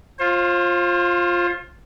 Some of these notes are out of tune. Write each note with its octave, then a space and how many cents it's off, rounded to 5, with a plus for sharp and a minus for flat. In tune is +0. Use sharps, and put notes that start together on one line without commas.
F4 +5 C5 +35